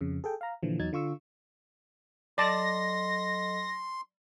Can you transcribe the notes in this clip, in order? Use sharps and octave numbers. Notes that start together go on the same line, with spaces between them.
F2 C#3
G#4 A4 G5
F5 A#5
A#2 D3 E3 F3
E2 F#3 D#4 G#6 A6
D3 F4 C#6 E6
F#3 A4 D5 D#5 A5 C6 A#6